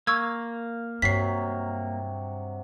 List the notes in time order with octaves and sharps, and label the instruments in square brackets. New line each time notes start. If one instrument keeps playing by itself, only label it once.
[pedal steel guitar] A#3 [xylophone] C#6 E6 G#6
[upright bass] G2 [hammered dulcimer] C3 F#3 [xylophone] B6 C7